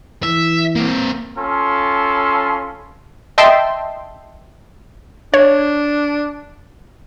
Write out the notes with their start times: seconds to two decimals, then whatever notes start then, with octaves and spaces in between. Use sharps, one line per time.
0.23 E3 E5
0.75 A#3 C4
1.37 C#4 F4 A4 B5 C6
3.38 D#5 E5 G5 A5 C6
5.34 D4 C#5